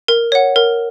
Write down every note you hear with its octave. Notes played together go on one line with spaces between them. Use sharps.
A#4
C#5 F#5
A#4